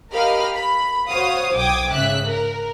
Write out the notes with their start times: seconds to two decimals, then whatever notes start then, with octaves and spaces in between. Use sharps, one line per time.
0.13 G4 A#4 D#5 F5 B5 F6
0.56 B5
1.10 F#4 C5 C#5 F5 D#6
1.56 B1 G5 D6 D#6 G#6
1.93 G#2 C#3 E5 F#6 B6
2.25 A#4